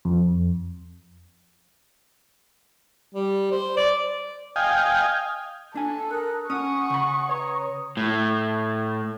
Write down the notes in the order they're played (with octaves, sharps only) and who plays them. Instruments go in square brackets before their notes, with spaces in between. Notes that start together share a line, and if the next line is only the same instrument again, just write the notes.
[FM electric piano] F2
[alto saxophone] G3
C5
D5
[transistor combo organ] D#5 F5 G5 G#5
[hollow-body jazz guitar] D4 G#5 [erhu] A4
[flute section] A#4 D#6 F#6
[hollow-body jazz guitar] C#4 [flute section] F#5 G#5 [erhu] C#6 [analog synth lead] D#6
[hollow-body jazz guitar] C#3 B5
[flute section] B4 A#5 D#6 [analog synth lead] C#5
[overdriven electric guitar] A2